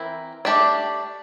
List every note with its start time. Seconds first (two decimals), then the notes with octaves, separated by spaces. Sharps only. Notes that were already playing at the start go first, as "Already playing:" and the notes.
Already playing: E3 C4 E4 A#4
0.45 A3 D4 G4 D5